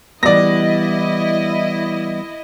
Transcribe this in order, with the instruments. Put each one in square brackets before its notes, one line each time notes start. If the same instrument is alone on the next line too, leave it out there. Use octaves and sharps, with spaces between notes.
[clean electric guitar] E3 G3 B3 [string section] E4 D#5 [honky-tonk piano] D5 A#6